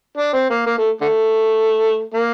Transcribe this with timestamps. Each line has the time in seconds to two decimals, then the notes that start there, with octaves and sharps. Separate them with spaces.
0.18 D4
0.33 C4
0.50 A#3
0.66 A#3
0.78 A3
1.01 D3 A3
2.13 A#3